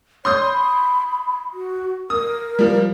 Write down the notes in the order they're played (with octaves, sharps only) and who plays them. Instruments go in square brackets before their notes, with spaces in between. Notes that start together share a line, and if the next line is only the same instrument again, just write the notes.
[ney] C#5 [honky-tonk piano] C6 D#6 G6
[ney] B5
F#4
[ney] A#4 [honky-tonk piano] D#6
[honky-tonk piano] F3 G3